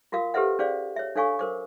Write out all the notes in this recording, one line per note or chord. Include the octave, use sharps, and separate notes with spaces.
F4 F#4 A#4 F5 D#6
G4 A4 B4 C5 E5 F#5
C#4 G#4 C5 D5 F5
C#5 E5
D4 A4 C#5 F5 G#5 C#6
A#4 C5 D6